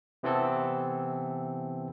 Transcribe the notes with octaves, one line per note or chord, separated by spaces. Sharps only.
C3 E3 B3 C4 E4 A4